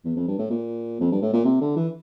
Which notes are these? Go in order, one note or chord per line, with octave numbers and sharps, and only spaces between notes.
E2
F2
G2
A2
A#2
F2
G2
A2
A#2
C3
D3
E3